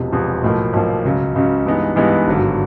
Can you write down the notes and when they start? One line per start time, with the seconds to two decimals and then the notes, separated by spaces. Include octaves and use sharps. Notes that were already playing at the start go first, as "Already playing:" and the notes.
Already playing: E1 E2 C3 F3
0.12 E1 E2 C3 F3
0.43 B1 A2 F3 A#3
0.73 B1 A2 F3 A#3
1.04 C#2 C#3 F#3
1.35 C#2 C#3 F#3
1.66 G2 E3 G#3 B3 D#4
1.96 G2 E3 G#3 B3 D#4
2.27 G#1 G2 D3 F#3